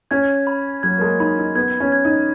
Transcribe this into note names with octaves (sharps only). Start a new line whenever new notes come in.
C#4 G#6
B5
F#3 G#6
A#3
G#3
D#4 B5
D#4
B3 G#6
C#4
G#6
D#4